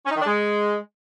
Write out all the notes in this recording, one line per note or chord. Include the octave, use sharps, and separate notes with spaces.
C#4
D#4
D#3
D4
G#3